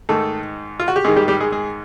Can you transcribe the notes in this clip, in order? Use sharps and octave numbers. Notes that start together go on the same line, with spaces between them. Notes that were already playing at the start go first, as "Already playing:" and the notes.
G#2 D#3 A3 A4
F4
F#4
G4
G#2 D#3 G#3 G#4
G3 G4
G3 G4
G#3 G#4
G#3 G#4